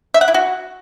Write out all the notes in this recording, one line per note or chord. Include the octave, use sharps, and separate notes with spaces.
E5
F#5
E4
F#4